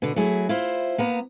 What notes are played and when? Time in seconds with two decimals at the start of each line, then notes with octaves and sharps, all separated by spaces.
0.02 B2 D3
0.16 F#3 A3 E4 G#4
0.49 E4 F4 C5
0.98 A#3 B3 A#5